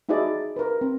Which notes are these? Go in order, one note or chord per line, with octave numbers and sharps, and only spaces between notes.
D#4 E4 F#4 G#4 D5 D#5
A#4 B4
C4